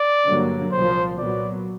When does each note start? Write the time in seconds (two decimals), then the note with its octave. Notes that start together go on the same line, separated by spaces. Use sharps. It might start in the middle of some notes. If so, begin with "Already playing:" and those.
Already playing: D5
0.25 G2 D3 F#3 A#3
0.72 C2 A#2 F3 C5
1.18 A#2 F#3 B3 D5